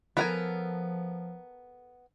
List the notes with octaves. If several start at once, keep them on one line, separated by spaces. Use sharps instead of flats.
F3 B3 A4 A#4 F#5 G#5 A#5